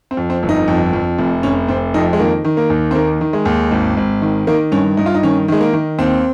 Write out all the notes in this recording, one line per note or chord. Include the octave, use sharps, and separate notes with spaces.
C4
F2
C4
G1
D#4
F2
F2
F1
F1 C#4
F1 C4
F2 D#4
G#3
D#3 A#3
D#3
A#3
D#2
C4
D#3 A#3
D#3
G#3
D#2
G#1
G#1
D#3
D#3 A#3
G2 C#4
G2 D#4
F4
D#4
D#3 C#4
D#3 G#3
A#3
D#3
D#2 C4